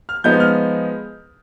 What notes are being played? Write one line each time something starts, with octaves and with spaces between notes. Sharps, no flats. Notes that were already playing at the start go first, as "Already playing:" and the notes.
F6
F3 G#3 B3 D#4 G6
F6